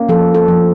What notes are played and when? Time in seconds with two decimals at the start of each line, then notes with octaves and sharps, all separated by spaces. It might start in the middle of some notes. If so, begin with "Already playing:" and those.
Already playing: A#3 C#4
0.09 F3 A4
0.35 A4
0.48 F3